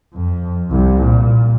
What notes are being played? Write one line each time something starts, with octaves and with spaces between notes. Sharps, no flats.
F2
C2
A#2